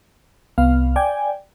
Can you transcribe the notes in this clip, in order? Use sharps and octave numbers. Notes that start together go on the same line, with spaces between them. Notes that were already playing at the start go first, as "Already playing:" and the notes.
C2 B3 F5
D5 G5 G#5